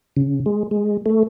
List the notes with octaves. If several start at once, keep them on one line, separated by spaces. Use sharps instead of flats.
C#3
G#3
G#3
A3